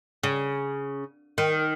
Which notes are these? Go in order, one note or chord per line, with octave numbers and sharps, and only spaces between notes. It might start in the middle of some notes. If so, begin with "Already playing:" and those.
C#3
D#3